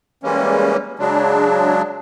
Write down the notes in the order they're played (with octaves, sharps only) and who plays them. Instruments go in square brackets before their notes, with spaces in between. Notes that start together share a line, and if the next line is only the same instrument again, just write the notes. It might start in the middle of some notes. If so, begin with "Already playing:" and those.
[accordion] E3 G3 G#3 A#3 C#4
C#3 F#3 G#3 D4